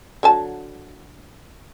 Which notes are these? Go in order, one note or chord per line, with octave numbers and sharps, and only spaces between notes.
D3 F#3 A5